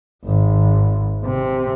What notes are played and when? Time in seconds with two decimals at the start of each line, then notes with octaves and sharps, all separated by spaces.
0.24 G#1
1.25 C3